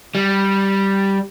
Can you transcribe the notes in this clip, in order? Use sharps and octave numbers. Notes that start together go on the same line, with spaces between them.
G3